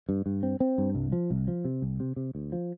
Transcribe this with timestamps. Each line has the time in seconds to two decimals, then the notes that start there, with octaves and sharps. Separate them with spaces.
0.09 G2
0.26 G2
0.43 C4
0.60 C4
0.78 G2
0.95 C2
1.12 F3
1.30 C2
1.48 F3
1.65 C3
1.82 C2
2.00 C3
2.16 C3
2.35 D2
2.52 F3